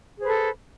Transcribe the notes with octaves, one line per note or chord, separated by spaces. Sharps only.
G#4 A4 B4 C5